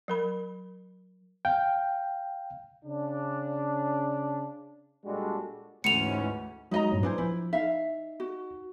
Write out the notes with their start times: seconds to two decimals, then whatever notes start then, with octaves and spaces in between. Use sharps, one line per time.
0.08 F#3 A#4 B5
1.45 F5 G5
2.85 C#3 D4
5.05 A#2 G3 G#3 D4 F#4 A4
5.84 D2 G#2 E3 C#4 C#7 D#7 F7
6.71 F#3 G#3 D#4 F#4 D#5 A#5
6.92 G2 A#2 F#3
7.03 D4 E4 B4 C5 G#5
7.18 F3 E4
7.53 D#4 E5 F5
8.20 F#4